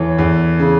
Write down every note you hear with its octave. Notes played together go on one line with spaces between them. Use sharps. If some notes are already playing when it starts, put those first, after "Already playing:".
Already playing: E2 E3 A4 C#5
E2
C#3